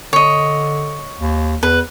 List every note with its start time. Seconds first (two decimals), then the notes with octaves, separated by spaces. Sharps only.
0.13 D3 C#5 D#5
1.20 D#2
1.63 E2 B4